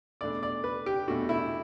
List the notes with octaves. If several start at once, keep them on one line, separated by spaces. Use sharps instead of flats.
E2 B2 A3 D4 D5
D5
B4
G4
E2 B2 A3 D4 F#4
E4